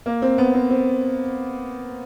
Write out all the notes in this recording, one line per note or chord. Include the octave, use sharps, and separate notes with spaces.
A#3
C4
B3
C4
C4